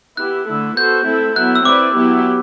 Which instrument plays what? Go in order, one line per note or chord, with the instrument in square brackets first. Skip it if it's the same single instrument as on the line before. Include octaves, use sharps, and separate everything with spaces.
[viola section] B3 E4 G4 [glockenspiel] F#6
[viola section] D3 A3 E4 A4
[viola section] B3 F#4 A4 C5 [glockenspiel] G6
[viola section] A3 C4 E4 A4
[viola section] F#3 B3 E4 [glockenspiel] F#6
[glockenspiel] E6
[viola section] C4 E4 B4 D5 [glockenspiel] D6
[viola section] F#3 B3 E4 G4